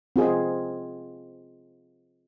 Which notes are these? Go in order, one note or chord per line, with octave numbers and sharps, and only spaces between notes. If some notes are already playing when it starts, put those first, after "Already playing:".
C4 F4 G#4